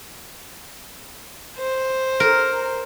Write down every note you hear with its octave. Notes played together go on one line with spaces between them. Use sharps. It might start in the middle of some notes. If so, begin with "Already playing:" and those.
C5
A#4